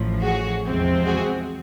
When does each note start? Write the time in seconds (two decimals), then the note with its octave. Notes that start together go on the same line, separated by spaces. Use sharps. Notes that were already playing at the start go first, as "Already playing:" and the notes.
Already playing: A1 A2 F3
0.21 F#4 G#4
0.64 E2 C3 F3 G#3 C4
1.05 F#4 G#4